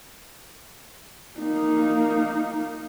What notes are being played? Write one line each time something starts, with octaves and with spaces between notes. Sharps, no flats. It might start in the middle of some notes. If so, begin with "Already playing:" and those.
A#3 D#4